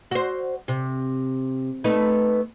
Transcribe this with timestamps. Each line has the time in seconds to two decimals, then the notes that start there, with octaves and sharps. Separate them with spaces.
0.11 F#4 C5
0.68 C3
1.84 A3 B3 D#4